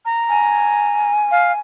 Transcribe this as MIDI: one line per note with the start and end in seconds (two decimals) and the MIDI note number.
0.05 1.11 82
0.29 1.59 80
1.31 1.52 77